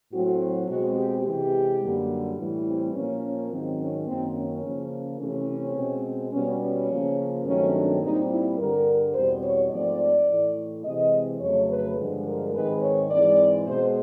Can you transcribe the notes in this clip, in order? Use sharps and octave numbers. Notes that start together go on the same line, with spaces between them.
A2 F#3 A3 C4 F#4
B2 G#3 C4 F#4
G4
C3 E3 G#3 G4
F#2 D3 G3 A#3
A2 E3 G3
C4
A#2 F3 A#3 C#4
C#4
G#2 D#3 F#3 C4
C#4
F#2 D#3 F#3 A#3 C4
C#4
C#3 F3 A#3
C3 E3 A3 C4 C#4
B2 G#3 C4
B2 G3 B3 C#4
C#4
C#3 F3 A#3
G2 D#3 F#3 A3 C4 C#4
D4
A#2 G3 C4 D#4
E4
G2 D3 G3 A#4
E2 B2 G3 C4 C5
C#5
G#2 F3 A3 C4 D5
A2 E3 A3
C3 E3 G#3 C4 D#5
F2 C#3 F#3 A3 C#5
B4
G2 D3 F3 G#3
A#4
G#2 D#3 G#3 C4 B4
C#5
G#2 E3 G#3 C4 D5
B2 G#3 B3 C5